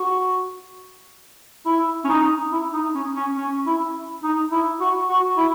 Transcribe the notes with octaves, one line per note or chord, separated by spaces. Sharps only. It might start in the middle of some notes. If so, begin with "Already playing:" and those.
Already playing: F#4
E4
C#4
D#4
E4
D#4
C#4
C#4
C#4
E4
D#4
E4
F#4
F#4
E4